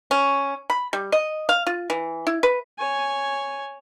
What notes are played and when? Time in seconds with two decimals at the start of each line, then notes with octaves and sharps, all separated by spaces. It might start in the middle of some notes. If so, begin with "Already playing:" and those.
0.11 C#4
0.70 B5
0.93 G3
1.12 D#5
1.49 F5
1.67 F4
1.90 E3
2.27 E4
2.43 B4
2.79 C#5 G#5